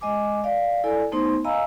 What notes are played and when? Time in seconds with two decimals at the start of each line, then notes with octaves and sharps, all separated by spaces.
0.01 G#3 D#5 G#5 D6
0.44 D5 F5
0.84 E4 A4 D5 G#5
1.12 A3 B3 D#4 C5 C6
1.44 D#5 F5 G#5 A#5 B5 E6